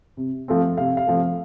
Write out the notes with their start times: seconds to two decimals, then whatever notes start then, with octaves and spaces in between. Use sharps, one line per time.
0.17 C3
0.48 F3 A3 C4
0.78 C3 F5
0.97 F5
1.07 F3 A3 C4